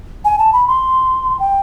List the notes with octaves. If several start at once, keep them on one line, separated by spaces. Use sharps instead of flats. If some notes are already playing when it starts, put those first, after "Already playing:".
G#5
A5
B5
C6
G5